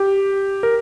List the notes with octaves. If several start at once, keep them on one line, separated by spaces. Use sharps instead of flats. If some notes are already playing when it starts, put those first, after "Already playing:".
Already playing: G4
A#4